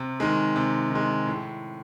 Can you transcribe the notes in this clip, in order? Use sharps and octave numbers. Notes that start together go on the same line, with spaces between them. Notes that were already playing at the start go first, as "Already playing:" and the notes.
Already playing: C3
D#3 G#3
C3
D#3 G#3
A2